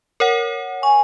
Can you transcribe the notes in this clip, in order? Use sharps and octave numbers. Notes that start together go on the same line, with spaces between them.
A#4 C#5 F#5
G#5 C#6